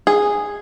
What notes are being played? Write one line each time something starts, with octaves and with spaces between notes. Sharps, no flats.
G#4